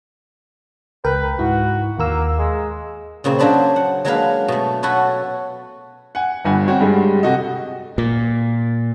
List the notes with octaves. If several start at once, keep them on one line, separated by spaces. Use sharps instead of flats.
C#2 A#4 B4 G5
G#2 E4 F#4
D#2 A#3 A#4 E6
G#3
A#2 C#3 A#3 C4
F#3 A#3 D4 C5 B5
F#5
F#3 G#3 A#3 D4 B4 F5
B2 A3
F#4 A4 B4 C#5
F#5 G#5
G1 G2 F#5 G#5
C4 F#4 C#5
G2 G3 G#3
C3 F#4 A4 D#5
A#2